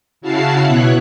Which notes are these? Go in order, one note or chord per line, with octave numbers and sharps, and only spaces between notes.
C#3 E4 F#4 F5 A5 C7
B2 B3 E4 C#5 F#6